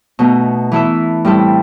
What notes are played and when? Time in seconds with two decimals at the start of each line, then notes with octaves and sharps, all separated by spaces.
0.19 B2 A3 D#4
0.72 E3 A3 E4 A4 E5
1.25 A2 G3 C4 E4 A4